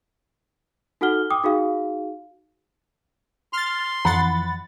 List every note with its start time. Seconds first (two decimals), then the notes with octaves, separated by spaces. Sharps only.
1.01 D#4 F#4 A4 F#5 F6 G7
1.30 G5 D6 D#6
1.44 D#4 F#4 G#4 F5
3.53 C6 F6 A6
4.05 F2 E3 F#5 B5 A6